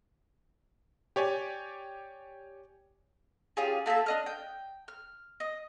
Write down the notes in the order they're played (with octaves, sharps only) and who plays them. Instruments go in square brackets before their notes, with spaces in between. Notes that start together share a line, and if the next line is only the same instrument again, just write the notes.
[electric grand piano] G4 C#5 D5 G#5
[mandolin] C#4 F4 G4 G#4
A3 A#3 A4 E5
D4 D#5 F6
G5
F6
D#5